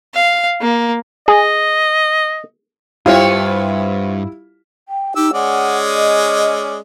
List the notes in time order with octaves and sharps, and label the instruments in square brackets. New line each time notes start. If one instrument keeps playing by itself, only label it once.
[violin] F5
A#3
[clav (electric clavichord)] G#4 [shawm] D#5
[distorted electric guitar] G2 [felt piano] G3 E4 [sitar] B3 C4 C#5 [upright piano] F4
[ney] G5
[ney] D#4 [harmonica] G4 E6
[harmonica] G#3 C#4 D5 [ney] F#5
[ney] D#5